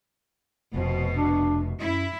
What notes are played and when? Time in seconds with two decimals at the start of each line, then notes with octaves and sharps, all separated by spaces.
0.74 F1 B2 F3
1.16 D4
1.79 F#2 E4